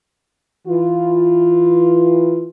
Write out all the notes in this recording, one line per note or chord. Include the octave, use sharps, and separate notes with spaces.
E3 F4